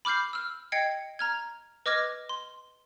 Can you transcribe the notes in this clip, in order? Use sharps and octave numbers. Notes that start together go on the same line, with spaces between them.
B5 D6 F6 G6 C7
E6 F6
D#5 G5 G#6 C7 C#7
A#5 F6 G#6
B4 D#5 D6 F6 G#6 A#6
C6